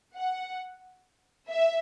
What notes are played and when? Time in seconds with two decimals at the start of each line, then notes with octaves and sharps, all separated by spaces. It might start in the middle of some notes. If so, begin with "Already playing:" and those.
0.16 F#5
1.50 E5